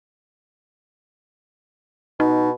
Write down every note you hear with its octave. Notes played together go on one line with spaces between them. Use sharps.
B2 D#4